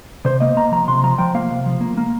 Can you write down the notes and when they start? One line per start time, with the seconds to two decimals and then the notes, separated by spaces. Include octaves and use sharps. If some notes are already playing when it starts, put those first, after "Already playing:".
0.25 C3 C5
0.40 A#3 D#5
0.57 A#3 A#5
0.72 F3 A#5
0.88 C3 C6
1.04 F3 A#5
1.18 F3 G5
1.35 A#3 F5
1.51 C3
1.66 F3
1.81 A#3
1.97 A#3